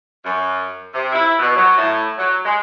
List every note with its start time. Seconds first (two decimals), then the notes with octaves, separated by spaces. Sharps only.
0.24 F#2
0.93 C3
1.13 E4
1.39 B2
1.56 F#3
1.77 A2
2.17 F#3
2.45 G#3